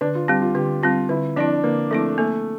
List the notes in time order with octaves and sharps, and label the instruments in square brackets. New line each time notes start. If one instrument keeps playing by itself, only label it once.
[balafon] D3 [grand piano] D4
[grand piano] F4
[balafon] G3 C4 [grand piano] G4
[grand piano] F4
[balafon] D3 [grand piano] G4
[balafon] G3 C4 [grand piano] F4
[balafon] D3 [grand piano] E4
[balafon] F3 C4 E4 [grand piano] D4
[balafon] D3 [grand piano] A#3
[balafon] F3 C4 E4 [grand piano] A3
[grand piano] A3 [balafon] A#3